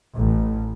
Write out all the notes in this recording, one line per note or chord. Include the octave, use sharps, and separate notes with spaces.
A1